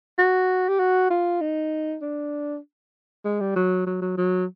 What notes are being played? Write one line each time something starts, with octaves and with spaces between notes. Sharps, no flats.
F#4
G4
F#4
F4
D#4
D4
G#3
G3
F#3
F#3
F#3
F#3